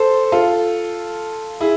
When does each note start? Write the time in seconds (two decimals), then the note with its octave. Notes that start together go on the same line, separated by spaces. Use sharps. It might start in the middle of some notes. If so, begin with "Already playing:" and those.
Already playing: A4 C5
0.32 F4 A4
1.60 E4 G#4